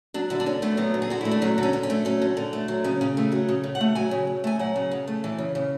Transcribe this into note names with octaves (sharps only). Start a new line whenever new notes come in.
F#3 D4
D3 E4
D4
D3 C#4
A3 B3
F#3 B3
D3
G#4
D3 F#4
A3 E4
D4
F#3 C#4
D3
C#4
D3
C#4
A3
F#3 C#4
D3
D3
A3
F#3
C#3 C#4
C#3 C#4
A3
F#3 F#4
C#3
C#3
F#5
A3
F#3 G#5
C#3
C#3
A3 G#5
F#3 F#5
C#3
C#3
A3
E3
C#3
C#3